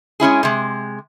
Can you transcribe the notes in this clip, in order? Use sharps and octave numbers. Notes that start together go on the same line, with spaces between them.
G#3 C#4 E4 G#4
C3 G#3